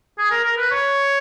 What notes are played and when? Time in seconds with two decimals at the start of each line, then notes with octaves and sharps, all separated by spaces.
0.18 G#4
0.31 A#4
0.44 A#4
0.57 B4
0.71 C#5